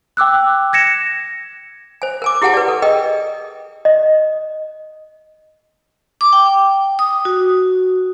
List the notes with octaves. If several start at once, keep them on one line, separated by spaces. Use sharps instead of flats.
G5 D6 E6 F#6
G#6 A#6 C#7 E7
C5 G#5
A#4 G#5 D6
E4 G4 G#4 F#5 G#5 A5
B4 D5
A4
G#4 A#4 D#5 G5
D#5
D6
G5
D#6
F#4